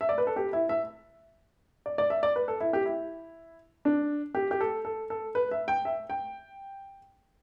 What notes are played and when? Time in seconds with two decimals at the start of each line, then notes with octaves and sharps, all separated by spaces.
0.01 E5
0.09 D5
0.18 B4
0.27 A4
0.36 G4
0.53 E4
0.69 E5
1.86 D5
1.98 D5
2.10 E5
2.23 D5
2.36 B4
2.48 A4
2.61 E4
2.73 G4
2.86 E4
3.85 D4
4.35 G4
4.51 G4
4.61 A4
4.85 A4
5.10 A4
5.35 B4
5.51 E5
5.68 G5
5.85 E5
6.10 G5